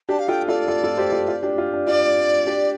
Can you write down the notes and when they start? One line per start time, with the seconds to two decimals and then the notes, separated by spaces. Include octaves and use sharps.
0.09 D4 G4 A5
0.19 F5
0.28 F4 A4 G5
0.48 F4 A4 D5
0.68 F4 A4
0.84 F4 A4
0.98 G4 C5
1.12 F4 A4
1.28 F4
1.43 D4 G4
1.58 F4
1.73 D4
1.87 F4 D5
2.47 D4 G4